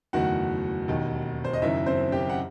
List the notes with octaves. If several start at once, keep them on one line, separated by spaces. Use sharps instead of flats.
F#1 E2 D#3 A3 F#4 F#5
E1 D#2 D#3
C5
D#5
F#1 F#2 D#3 E4 E5
C4 C5
G4 G5
F#5